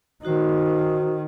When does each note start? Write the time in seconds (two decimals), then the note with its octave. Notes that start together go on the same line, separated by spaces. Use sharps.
0.23 D#3 D#4 F#4 C5